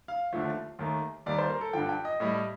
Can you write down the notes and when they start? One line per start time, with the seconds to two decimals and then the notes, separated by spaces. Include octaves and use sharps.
0.08 F5
0.33 D#2 D3 F3 A3
0.79 D#2 D#3 A3
1.26 D#2 D#3 G3 D5
1.38 C5
1.50 A#4
1.61 A4
1.73 G2 D3 F3 G5
1.89 G5
2.05 D#5
2.20 A2 G3 D#5